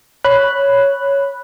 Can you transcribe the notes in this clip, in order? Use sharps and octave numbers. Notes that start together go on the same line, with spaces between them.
C#5 B5 F#6